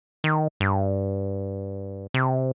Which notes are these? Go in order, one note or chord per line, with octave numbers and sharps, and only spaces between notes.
D#3
G2
C3